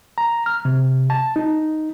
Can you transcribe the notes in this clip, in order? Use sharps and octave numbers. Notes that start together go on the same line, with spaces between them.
A#5
F6
C3
A5
D#4